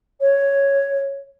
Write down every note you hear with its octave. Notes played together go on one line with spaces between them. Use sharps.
C#5